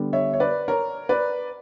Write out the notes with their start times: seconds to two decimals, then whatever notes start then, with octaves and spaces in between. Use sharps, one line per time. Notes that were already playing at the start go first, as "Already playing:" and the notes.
Already playing: D3 G3 B3
0.13 C#5 E5
0.33 C#5
0.40 B4 D5
0.68 A#4 C#5
1.09 B4 D5